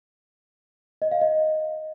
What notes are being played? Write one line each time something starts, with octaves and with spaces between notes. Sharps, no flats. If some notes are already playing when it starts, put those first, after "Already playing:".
D#5
F5
D#5